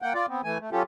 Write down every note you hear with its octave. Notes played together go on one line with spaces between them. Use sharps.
A#3 F#5 G5
F4 D5
B3 C4
E3 A3 G#5
A3
F#3 C#4 F4 G4 A4